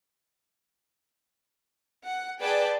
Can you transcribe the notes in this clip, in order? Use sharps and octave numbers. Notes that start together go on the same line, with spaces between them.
F#5
G#4 B4 D5 G5 A5